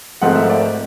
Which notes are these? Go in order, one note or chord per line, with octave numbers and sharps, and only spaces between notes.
G#1 G#2 F3 A3 C4 F#5
E5
D5